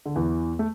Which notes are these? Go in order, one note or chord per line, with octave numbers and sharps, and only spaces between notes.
D3
E2 E3
A3